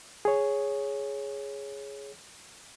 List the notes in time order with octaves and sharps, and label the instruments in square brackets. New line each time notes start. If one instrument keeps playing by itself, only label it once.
[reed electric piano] G#4 C#5